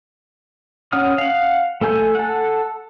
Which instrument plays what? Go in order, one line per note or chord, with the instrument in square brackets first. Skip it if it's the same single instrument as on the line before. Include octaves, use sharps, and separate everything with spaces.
[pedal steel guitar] C#4 F#5 D#6 F6
F5 F#5
A3 A4 G#5 G6
A4 F#5